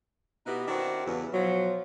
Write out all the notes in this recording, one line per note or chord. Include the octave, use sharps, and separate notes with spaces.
B2 B3 D#4 E4 G4
D#3 C4 D4 E4 F#4
E2 G2 C#3 E3
B2 F3 F#3